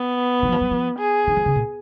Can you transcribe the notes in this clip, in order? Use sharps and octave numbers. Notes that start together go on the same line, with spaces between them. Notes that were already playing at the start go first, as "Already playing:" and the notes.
Already playing: B3
D#3
F#3
F3
F#3
F3
G#4
D#3
F3
C#3
A#2